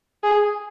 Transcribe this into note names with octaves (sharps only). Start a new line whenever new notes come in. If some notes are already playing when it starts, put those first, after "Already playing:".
G#4